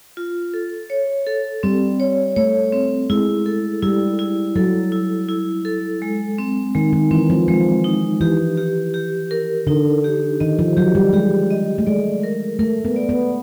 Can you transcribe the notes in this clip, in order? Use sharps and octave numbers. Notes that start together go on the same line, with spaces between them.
F4
A4
C#5
A4
G3 C4
C#5
A3 C#5
C4
G#3 E4
A4
G3 E4
E4
F#3 A4
E4
E4
A4
G#3
C4
D#3 G#3
D#3
E3 C4
F3
F3 G#3
D#4
E3 G4
G4
G4
A#4
D3 D#4
G4
D#3 D#5
F3
F#3 G4
G3
G#3 G4
D#5
A3
G#3 D5
A#4
A3 A#4
B3
D5
B3